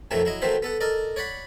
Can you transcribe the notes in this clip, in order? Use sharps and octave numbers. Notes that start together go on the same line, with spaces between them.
F2 C3 D#3 F#3 A3 E4
F#3 E4 D#5
D#3 F#3 A3 C4 B4 C5
B3 A4 F#5
A4 A#4 D5 D#5
C#5 D5 F#5 B5